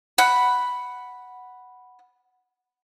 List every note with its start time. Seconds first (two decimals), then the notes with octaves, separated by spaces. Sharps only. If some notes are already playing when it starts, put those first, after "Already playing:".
0.18 F#5 B5